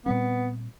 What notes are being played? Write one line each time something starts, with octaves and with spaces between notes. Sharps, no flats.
A#2 G3 B3 C4